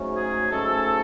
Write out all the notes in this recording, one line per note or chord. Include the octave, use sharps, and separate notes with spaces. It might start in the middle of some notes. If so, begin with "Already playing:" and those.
Already playing: G#2 F#3 A3 C#4
G#4
G#2 F#3 A3 C#4 A4